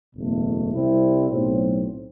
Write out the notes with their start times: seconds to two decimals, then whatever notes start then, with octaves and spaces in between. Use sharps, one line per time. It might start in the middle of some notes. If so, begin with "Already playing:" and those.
0.15 F#1 E2 B2 A3
0.72 C2 C3 G3 C4 E4
1.29 B1 A2 F#3 C4